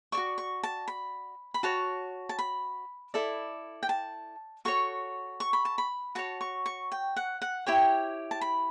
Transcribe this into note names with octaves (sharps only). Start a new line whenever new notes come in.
A4 D5 C#6
F#4
C#6
A5
B5
B5
F#4 C#5 A5
A5
B5
E4 A4 D5
G5
A5
F#4 A4 C#5 C#6
C#6
B5
A5
B5
F#4 C#5 A5
C#6
C#6
G5
F#5
F#5
E4 G4 C#5 G5
A5
B5